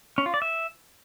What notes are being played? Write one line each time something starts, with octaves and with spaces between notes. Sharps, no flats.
C#4
F4
D5
E5